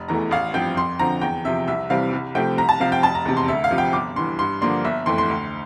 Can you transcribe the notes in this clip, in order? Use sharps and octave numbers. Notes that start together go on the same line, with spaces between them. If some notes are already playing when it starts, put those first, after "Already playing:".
Already playing: F1
E2 E3 A3 A#5
A1 F5
G2 F3 C4 G5
F2 C6
D3 F3 C4 A#5
E2 G5
C3 F3 E5
C2 E5
C3 E3 G3 C4 F5
C2
C3 F3 A3 C4 G5
C2 A#5
A5
C3 F3 C4 F5
G5
F1 A5
A#5
E2 C3
C6
D2 E5
F5
C3 F3
G5
G1 D6
G2 E3 C6
G2 C6
D3 F3 A#3 D4 C6
G1 E5
F2 E3 A3 C6
C6
D2